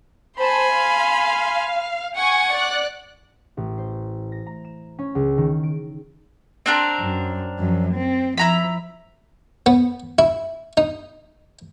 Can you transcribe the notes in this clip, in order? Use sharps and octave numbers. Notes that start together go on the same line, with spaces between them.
C5 G#5 A5 B5 C6
F5
F#5 G#5 C#6 G#6
D5 F#6
A1
C5
A#6
A#5
E7
C#4
C#2
D#3
D7
C4 D4 A#4
F#2
F#2 F3
C4
F3 E4 A#5 B5
B3
E4
D#4